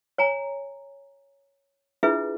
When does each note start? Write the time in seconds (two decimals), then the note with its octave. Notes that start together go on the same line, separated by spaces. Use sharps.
0.18 C#5 G#5 A#5
2.03 D4 E4 F4 G#4 B4 E5